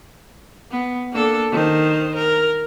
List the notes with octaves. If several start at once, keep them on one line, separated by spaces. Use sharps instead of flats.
B3
A#3 D4 A4
D#3 C5
A#4